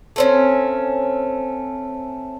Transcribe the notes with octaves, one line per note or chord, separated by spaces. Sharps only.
A3 C4 C#4